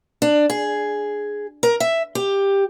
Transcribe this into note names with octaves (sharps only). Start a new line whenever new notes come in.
D4
G#4
A#4
E5
G4